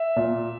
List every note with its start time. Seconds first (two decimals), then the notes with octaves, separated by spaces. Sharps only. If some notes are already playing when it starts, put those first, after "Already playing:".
Already playing: E5
0.16 A#2